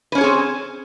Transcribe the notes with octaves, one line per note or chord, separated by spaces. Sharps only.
C4 C#4 G#4 B4 C#5